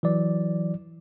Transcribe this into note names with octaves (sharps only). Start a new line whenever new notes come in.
E3 F#3 D5